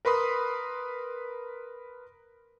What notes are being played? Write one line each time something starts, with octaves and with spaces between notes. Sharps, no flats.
A#4 B4 B5 C6 D#6